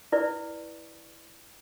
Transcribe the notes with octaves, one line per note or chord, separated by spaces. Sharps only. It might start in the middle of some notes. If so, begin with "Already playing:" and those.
E4 B4 D5